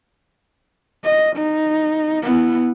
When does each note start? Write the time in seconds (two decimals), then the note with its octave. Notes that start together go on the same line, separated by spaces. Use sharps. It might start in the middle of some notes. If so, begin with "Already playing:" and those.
1.04 D#5
1.36 D#4
2.22 B3 E4